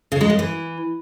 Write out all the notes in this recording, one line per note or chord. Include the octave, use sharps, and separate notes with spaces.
C#3
G#3
F#2
E3